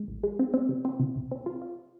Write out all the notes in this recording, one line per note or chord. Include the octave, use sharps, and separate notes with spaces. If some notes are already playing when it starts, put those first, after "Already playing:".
Already playing: G#3
A1
G#3
C4
C4
C3
C4
C3
C2
C4
F4
F4